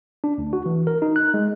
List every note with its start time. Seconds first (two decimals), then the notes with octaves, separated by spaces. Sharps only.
0.24 D4
0.38 D2
0.53 F#4
0.66 E3
0.87 A#4
1.02 D#4
1.16 F#6
1.34 G#3